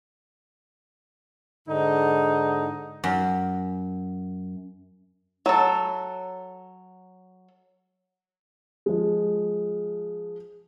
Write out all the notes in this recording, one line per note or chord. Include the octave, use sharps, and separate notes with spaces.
G#2 D3 D#4
F#2
F#3 A4
F3 G#3